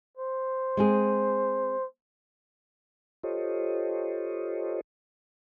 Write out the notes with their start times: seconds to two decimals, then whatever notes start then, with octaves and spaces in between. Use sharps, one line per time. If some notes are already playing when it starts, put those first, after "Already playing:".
0.17 C5
0.77 G#3 C4 G#4
3.23 F4 G4 A4 C5 C#5 D#5